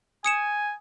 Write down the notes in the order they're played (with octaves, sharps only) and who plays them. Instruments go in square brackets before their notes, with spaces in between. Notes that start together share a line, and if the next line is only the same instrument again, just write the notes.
[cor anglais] G#5 [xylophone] D#6 C#7 E7